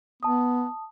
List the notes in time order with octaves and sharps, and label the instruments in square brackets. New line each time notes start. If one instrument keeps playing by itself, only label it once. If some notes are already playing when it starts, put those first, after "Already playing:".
[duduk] B3 [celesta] A5 D#6